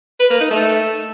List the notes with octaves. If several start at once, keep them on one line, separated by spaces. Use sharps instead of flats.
B4
A#3
D#4
A3